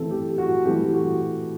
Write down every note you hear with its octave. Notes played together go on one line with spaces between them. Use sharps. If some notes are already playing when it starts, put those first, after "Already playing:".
Already playing: E3 A3 C4 A4
G4
F#4
E3 A3 C4 G4
F#4